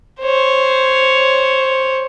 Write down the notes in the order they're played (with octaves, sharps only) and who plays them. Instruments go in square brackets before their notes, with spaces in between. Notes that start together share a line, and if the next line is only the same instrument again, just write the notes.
[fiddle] C5 C#5